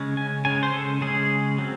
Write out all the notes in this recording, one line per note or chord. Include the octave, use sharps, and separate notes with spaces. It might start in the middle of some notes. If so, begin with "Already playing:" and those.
Already playing: C#3 G#3 C#4
G#5
C#3 G#3 C#4 G#5
C5
A4
C#3 G#3 C#4 G#4
F#3 C4